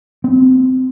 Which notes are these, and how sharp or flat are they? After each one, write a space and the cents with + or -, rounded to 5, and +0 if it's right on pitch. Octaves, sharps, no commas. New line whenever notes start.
C4 -20